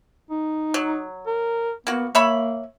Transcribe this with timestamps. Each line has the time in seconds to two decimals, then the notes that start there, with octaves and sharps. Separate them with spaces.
0.31 D#4
0.74 F#3
1.26 A#4
1.87 A#3 B3 F#4
2.15 A#3 C#5 E5 B5